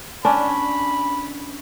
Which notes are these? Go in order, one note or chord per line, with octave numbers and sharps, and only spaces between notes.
C#4 D4 B5